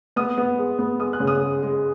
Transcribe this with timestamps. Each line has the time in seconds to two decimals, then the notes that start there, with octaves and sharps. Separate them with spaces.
0.16 B3 D#6
0.37 B3
0.58 G#3
0.79 B3
1.00 G#3 D#6
1.13 F#6
1.20 C#3
1.27 D#6
1.42 G#3
1.63 G#3